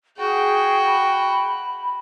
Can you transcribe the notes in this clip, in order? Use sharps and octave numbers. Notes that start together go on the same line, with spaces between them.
F#4 G#4 G5
B5